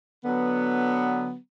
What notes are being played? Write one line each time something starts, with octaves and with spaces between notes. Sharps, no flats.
D3 F#3 B3